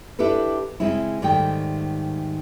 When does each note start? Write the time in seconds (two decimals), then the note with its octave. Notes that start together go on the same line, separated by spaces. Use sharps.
0.19 D4 E4 G4 A4 B4
0.80 C#3 G#3 C4 C#4 E4
1.22 G#2 D#3 G3 A3 G5